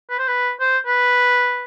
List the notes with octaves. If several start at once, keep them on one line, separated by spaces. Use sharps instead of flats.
B4
C5
B4
C5
B4